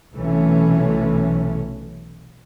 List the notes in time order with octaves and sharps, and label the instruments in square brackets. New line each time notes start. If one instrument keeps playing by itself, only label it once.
[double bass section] B1 C3 E3 A3 C#4